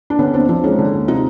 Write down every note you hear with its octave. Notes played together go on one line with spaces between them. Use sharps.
D4
D3 B3 C#4
D#2 C4 D4
F3 C4 D4
G#3 C#4 D#4
D3
D#2
C3 D#4 F4